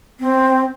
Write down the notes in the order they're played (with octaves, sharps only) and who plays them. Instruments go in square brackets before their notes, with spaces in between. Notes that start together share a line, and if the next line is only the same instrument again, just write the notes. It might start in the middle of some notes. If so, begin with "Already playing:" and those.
[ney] C4